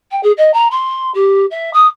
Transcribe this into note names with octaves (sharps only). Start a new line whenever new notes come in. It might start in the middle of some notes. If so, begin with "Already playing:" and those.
G5
G#4
D#5
A#5
C6
G4
E5
D#6